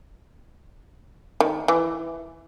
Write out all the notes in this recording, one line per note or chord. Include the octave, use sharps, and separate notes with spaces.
D#3
E3